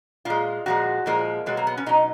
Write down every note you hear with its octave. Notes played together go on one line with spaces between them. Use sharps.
A#2 G#3 F4
A#2 F3 G#3 F#4
A#2 F3 G#3 A#3
B2 F#3 G#3
A#3
B3
C#4
B2 F#3 D#4